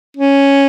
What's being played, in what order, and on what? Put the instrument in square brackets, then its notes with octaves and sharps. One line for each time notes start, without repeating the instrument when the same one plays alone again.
[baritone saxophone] C#4